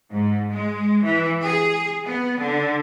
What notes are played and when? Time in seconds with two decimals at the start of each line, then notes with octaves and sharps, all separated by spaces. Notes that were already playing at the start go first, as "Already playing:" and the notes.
0.11 G#2
0.50 G#3
1.03 E3
1.43 G#4
2.04 B3
2.36 D3